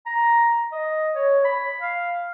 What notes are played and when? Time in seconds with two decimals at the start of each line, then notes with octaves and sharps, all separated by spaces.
0.06 A#5
0.72 D#5
1.15 C#5
1.44 B5
1.80 F5